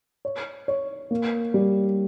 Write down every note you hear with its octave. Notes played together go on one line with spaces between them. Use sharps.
C#5
C#5
A#3
G3